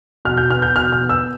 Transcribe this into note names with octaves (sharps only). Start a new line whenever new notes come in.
B2 F6
G6
B3 F6
G6
B2 F6
F6
B3
E6